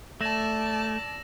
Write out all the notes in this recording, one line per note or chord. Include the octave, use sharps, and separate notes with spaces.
A3 D5 A5 E6 A#6 E7